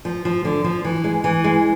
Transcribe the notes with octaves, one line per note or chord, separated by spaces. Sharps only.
F3
F3
D3
F3
E3
G#3
E3
G#3